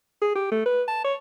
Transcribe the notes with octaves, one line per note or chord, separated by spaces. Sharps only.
G#4
G4
A3
B4
A5
C#5